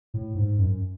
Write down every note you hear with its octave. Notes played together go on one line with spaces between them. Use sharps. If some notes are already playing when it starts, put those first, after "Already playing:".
A2
G#2
F#2